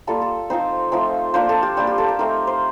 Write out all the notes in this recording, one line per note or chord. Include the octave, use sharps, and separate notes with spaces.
G3 A#3 F4 A4
A4
F3 C4 D#4 C5
F3 A3 C4 D#4
A#3 D4 F4 C5
A4
G4
G3 A#3 D4 G4
G4
A4
A#4
A3 C4 D#4 A#4
C5